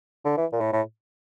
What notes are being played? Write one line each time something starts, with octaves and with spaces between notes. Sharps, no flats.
D3
E3
A#2
A2
A2